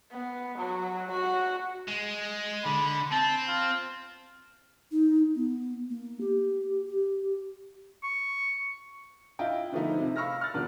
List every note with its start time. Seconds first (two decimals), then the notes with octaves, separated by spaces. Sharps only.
0.12 B3
0.59 F#3
1.12 F#4
1.88 G#3
2.65 D3 B5
3.11 C4 A5
3.47 F4
4.92 D#4
5.35 B3
5.90 A#3
6.21 G4
6.86 G4
8.03 C#6
9.39 D4 E4 F4 D#5 G5
9.72 D3 F3 A3 B3 D#4 E4
10.00 C3
10.16 F5 B5 C#6 E6 F6 A#6
10.40 C#6 F6 F#6 A6
10.54 D#1 C#3 B3 D4